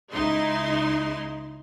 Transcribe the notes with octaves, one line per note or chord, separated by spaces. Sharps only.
C#2 D#4 E4 C6